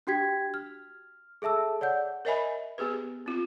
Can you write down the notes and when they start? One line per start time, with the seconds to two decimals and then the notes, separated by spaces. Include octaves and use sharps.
0.07 D4 F#4 G4 G5 G#6 B6
0.54 F6
1.42 G#4 A4 E5 A5 E6
1.81 C#5 D5 F#5 G6
2.25 A#4 C#5 D#5 E5 G#5 B5
2.78 B3 G4 G#4 B4
3.26 C4 F4